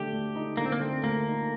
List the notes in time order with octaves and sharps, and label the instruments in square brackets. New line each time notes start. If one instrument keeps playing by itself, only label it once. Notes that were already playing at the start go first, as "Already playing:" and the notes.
Already playing: [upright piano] D3 A3 [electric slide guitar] G4
[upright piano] D2
D#4
[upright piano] D3 [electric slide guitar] A#3
[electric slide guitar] C4
A#3
[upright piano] A3 [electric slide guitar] C4
[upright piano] D2 [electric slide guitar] A#3
[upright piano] D#4